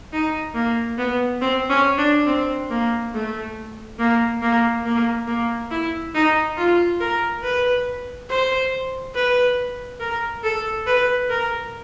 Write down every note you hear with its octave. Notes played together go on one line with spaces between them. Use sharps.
D#4
A#3
B3
C4
C#4
D4
C4
A#3
A3
A#3
A#3
A#3
A#3
E4
D#4
F4
A#4
B4
C5
B4
A#4
A4
B4
A#4